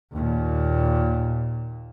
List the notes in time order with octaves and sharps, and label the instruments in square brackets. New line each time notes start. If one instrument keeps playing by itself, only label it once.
[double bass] D#2 A#2